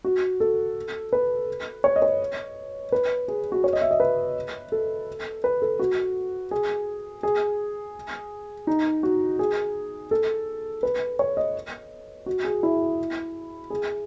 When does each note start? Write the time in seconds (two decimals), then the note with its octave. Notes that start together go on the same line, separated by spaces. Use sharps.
0.04 F#4
0.40 A4
1.13 B4
1.84 C#5
1.96 D#5
2.02 C#5
2.92 B4
3.28 G#4
3.52 F#4
3.64 C#5
3.73 D#5
3.82 E5
3.91 D#5
4.00 B4
4.72 A4
5.44 B4
5.62 A4
5.79 F#4
6.51 G#4
7.23 G#4
8.67 D#4
9.03 F#4
9.39 G#4
10.11 A4
10.83 B4
11.19 C#5
11.37 D#5
12.26 F#4
12.45 G#4
12.63 E4
13.70 G#4